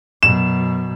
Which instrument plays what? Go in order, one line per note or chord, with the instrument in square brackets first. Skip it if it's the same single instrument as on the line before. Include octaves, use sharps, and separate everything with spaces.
[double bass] F#2 B2 [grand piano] E7